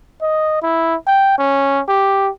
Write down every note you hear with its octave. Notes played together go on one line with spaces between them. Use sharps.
D#5
E4
G5
C#4
G4